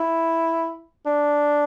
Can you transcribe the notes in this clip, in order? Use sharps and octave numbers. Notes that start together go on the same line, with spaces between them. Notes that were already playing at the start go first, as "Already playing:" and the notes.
Already playing: E4
D4